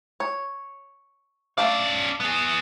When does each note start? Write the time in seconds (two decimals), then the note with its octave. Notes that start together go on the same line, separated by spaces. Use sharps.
0.20 C#5
1.58 A3 C#4 D4 D5 F5
2.20 B3 G#4